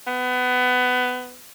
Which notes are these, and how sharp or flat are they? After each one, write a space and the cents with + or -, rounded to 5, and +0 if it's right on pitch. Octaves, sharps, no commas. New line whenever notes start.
B3 +20